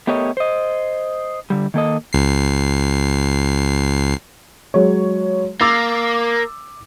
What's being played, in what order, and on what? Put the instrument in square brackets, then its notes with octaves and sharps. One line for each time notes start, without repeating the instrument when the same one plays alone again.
[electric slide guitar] A3 B3 G4 A#4 C#5 D#5
C5 D#5
D3 G3
D#3 A#3 A4 D#5
[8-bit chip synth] C#2 C7
[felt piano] F#3 G#3 C#5
[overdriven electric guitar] A#3 [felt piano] D6 E6 A6